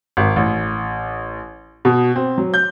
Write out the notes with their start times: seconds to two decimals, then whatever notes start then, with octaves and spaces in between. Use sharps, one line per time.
0.17 G#1
0.36 A1
1.85 B2
2.16 C4
2.38 F#3
2.54 G6